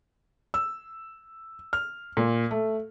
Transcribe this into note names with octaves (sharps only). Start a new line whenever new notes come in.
E6
F6
A#2
A3